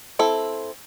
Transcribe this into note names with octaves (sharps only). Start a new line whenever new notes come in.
C4 E4 A4